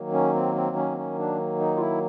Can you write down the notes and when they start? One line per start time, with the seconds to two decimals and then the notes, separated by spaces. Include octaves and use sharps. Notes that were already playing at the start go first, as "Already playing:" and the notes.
Already playing: D#3 F#3 A#3
0.13 C#4
0.35 C4
0.56 C4
0.76 C#4
0.92 C4
0.98 C#4
1.19 D4
1.60 D#4
1.76 F4
1.81 E4